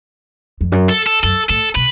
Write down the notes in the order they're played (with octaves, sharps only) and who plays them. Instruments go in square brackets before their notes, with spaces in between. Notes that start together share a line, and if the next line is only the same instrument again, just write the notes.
[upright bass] F2
F#2
[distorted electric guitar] A4
A4
[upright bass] F#2 [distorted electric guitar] A4
[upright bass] A2 [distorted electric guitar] A4
[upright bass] B2 [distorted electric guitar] B4